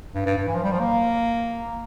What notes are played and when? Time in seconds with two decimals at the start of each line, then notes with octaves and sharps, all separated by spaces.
0.15 G2
0.26 G2
0.37 G2
0.48 E3
0.55 F3
0.64 G3
0.72 F3
0.80 A#3